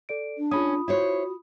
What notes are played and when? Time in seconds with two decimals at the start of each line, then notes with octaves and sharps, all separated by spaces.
0.09 A4 D5 D7
0.38 D4
0.51 C#4 F4 G#4 B5 D#6
0.88 E4 F#4 C5 C#5